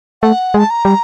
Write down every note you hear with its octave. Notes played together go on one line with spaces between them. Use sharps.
A3 F#5
G#3 A5
A#5
G3